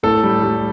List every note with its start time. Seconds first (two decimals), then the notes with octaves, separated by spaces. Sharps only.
0.03 A2 A4
0.23 G3
0.43 G3